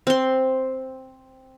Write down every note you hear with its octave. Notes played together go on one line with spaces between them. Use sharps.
C4 C6